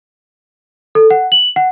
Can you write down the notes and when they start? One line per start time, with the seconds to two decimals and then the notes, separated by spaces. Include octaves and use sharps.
0.95 A4
1.11 F#5
1.32 F#7
1.56 F#5